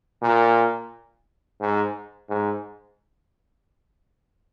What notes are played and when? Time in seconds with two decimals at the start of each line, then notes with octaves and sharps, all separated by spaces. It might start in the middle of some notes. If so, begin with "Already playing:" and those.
0.22 A#2
1.61 G#2
2.29 G#2